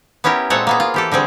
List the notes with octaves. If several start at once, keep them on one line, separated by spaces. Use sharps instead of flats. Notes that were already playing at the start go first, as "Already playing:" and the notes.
B3 C#4 E4 G4 A#4
A#2 G#3 C4 A4 C#5 F#5
A#3 B3 G#4
F4
E3 G4 A4
D3 G3 C4 G#4